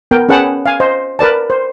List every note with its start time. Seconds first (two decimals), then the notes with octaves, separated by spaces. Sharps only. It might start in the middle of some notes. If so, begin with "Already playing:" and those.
0.11 B3 A#4 G5
0.29 C#4 G#4 B4 F#5 G5 A5
0.66 F5 G#5
0.80 C5 D#5
1.19 A#4 B4 D5 A5
1.50 C5